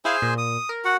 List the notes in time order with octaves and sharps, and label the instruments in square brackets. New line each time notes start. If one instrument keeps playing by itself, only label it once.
[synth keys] E4 F5 [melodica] G#4 C5 G#5
[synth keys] A#2
[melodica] D#6
[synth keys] A#4
[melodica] F#4 F#5